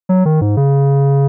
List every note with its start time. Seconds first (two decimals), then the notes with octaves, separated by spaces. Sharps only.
0.09 F#3
0.25 D#3
0.41 G#2
0.57 C#3